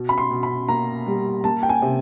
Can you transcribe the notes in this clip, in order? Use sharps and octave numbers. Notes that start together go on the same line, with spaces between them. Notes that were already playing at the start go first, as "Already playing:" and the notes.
Already playing: B2
B5
C6
B2
B5
A#3 A#5
G3
A#3 A5
G5
G#5
C3